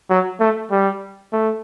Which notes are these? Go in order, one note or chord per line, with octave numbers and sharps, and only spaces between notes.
F#3
A3
G3
A3